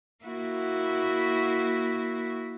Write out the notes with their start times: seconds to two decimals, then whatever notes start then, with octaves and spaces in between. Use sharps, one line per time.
0.24 A#3 E4 F#4